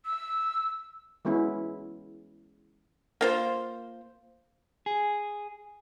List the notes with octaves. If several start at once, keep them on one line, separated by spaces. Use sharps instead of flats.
E6
E3 G#3 B3 C#4 E4
A#3 F4 C5
G#4